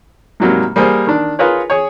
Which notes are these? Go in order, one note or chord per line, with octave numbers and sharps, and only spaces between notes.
G#2 C3 F#3 G3 A#3
G3 A#3 G#4 C5
D#3 D4
F4 G#4 A#4 B4 C#5
G#4 C#5